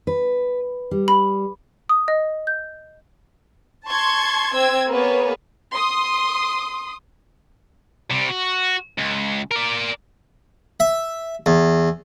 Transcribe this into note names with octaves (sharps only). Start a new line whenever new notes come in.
B4
G3
B5
D#6
D#5
G6
A5 C6 C#6 G#6
C4 E6 G#6
A#3 B3 G#4 B4 C#5
C6 D#6
C3 G3
F#4
C#2
A#4 D5
E5
E2